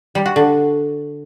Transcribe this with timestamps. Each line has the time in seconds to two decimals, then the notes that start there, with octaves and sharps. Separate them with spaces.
0.15 G3
0.26 F#4
0.36 D3